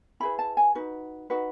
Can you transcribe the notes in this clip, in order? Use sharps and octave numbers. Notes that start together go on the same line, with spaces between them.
E4 G#4 B4 B5
A5
G#5
D#4 F#4 B4
D#4 F#4 B4